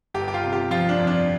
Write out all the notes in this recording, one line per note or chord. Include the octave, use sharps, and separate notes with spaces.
G1 G4
G4
F4
C3
G4
F3 F4
D4
F2
D4